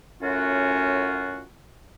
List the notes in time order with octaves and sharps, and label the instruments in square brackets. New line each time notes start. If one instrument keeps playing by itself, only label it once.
[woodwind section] F#2 A2 C#4 F4 F#4